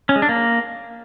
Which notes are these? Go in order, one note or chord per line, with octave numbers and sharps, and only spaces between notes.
C#4
G#3
D4
A#3